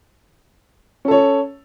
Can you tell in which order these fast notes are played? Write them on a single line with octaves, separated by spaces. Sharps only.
C#4 A4 C#5